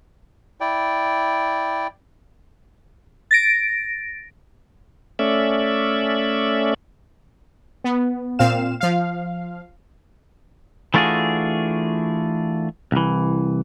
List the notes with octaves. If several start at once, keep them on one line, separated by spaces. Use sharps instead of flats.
E4 D5 G5
A6 A#6 D7
A3 C#4 D5 E5
B3
A#2 C4 F5 E7
F3 F5
E3 A3 D4 F4 F#4 G#4
C2 E3